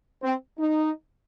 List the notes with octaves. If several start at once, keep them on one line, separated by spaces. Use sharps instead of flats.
C4
D#4